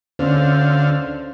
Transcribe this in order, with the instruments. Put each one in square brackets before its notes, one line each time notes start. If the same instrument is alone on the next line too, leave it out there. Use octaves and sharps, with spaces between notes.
[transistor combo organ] D2 D3 F5 [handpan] C#4 C5